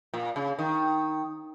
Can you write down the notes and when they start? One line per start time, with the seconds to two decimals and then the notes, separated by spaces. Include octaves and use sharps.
0.14 A#2
0.36 C#3
0.59 D#3